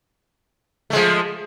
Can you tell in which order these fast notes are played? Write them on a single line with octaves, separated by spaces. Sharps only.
A3 G#3 F3